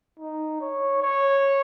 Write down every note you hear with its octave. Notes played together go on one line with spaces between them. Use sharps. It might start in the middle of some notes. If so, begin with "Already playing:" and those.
D#4
C#5
C#5